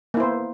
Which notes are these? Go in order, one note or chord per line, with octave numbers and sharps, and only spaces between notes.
A#3 B3 E4 C5